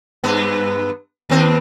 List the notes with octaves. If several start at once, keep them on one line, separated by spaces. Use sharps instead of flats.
G2 B3
D#2 C4